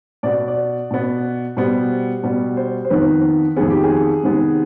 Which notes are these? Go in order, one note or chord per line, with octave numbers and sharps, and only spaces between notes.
B2 B3 D5
D5
B2 B3
B2 G3 B3 C5
B2 G3 B3
C5
C5
F2 D#3 B3 B4
F2 D#3 B3 G#4
G4
G#4
C3 D#3 G#3 B3